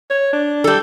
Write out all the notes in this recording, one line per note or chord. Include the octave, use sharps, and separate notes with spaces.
C#5
D4
G3 A4